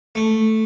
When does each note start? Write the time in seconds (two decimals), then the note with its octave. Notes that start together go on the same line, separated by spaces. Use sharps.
0.15 A3